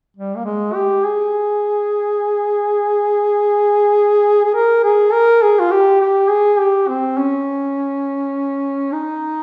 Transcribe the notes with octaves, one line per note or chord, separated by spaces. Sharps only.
G3
A#3
G#3
G4
G#4
G#4
A#4
G#4
A#4
G#4
F4
G4
G4
G#4
G4
C4
C#4
D#4